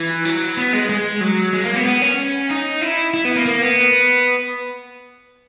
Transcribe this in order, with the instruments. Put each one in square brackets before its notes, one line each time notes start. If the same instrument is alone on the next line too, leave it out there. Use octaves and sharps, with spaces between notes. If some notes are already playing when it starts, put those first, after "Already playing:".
Already playing: [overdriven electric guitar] E3
F#3
B3
G#3
G#3
F#3
G#3
A#3
B3
B3
C#4
D#4
E4
E4
B3
A#3
A#3
B3